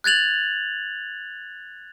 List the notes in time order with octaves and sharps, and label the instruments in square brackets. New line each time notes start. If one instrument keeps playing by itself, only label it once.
[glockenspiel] F#6 G#6 A6 F7 F#7